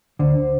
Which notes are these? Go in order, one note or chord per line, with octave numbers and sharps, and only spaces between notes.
D2 D3 C5
C5